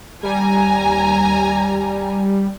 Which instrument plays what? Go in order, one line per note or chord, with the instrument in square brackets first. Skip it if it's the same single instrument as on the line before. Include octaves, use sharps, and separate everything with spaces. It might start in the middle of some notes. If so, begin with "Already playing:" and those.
[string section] D#2 G#5 A#5 [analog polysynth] G3